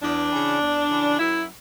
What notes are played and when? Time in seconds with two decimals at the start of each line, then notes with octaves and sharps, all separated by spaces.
0.02 E2 D4
0.32 C#3 E3
0.61 E2
0.90 C#3 E3
1.19 F#2 E4